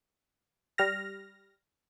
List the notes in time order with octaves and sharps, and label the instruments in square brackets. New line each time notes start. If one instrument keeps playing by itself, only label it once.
[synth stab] G3 F6 A#6